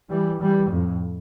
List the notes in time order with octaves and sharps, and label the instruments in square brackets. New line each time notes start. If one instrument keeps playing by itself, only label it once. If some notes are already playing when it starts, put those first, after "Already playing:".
[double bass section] E3 G3
E3 G3
F2 A2